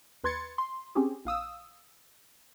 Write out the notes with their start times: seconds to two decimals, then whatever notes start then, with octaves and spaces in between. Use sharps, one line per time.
0.24 D#2 B4 C6 G#6 A6 C#7
0.58 C6
0.95 C4 C#4 G4 G#4
1.25 A#1 F5 D#6 E6